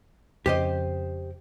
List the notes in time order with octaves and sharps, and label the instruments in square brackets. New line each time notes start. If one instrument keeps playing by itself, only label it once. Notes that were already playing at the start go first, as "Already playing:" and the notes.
[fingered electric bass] F2 C#3 [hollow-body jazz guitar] G4 C5 D#5